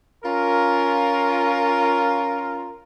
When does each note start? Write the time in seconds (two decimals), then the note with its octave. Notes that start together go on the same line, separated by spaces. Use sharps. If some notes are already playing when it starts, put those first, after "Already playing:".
0.24 C#4 F4 A#4